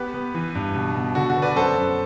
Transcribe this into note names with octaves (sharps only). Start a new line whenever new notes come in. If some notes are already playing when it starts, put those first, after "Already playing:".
Already playing: B3 G4 B4
B3
E3
G2
B2
B2
D3 F#4
F#4
B3
B4 D5
F#2 A4 C5
F#2